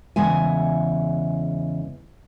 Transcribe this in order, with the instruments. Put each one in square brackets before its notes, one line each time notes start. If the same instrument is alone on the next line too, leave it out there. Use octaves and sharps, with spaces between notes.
[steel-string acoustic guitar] E2 C#3 G#3 E5 F#5 G#5